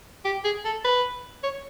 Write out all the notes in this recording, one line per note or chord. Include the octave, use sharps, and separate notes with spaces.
G4
G#4
A4
B4
C#5